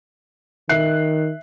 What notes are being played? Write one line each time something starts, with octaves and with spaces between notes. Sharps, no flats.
D#3 E5 F#6 C7